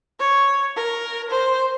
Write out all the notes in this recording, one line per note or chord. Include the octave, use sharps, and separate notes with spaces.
C#5
A#4
C5